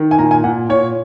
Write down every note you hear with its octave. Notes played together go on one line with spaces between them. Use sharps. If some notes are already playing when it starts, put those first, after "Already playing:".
Already playing: D#3
G#5
A#2 A#5
G#5
A#2 F#5
A#2 C#5